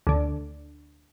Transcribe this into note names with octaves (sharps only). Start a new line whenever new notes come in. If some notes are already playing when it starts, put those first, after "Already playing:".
D2 D3